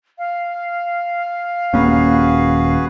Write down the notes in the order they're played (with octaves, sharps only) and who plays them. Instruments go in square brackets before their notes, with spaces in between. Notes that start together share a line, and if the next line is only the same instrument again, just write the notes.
[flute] F5
[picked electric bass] D#1 A#3 C#4 [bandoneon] F#4 G#4 B4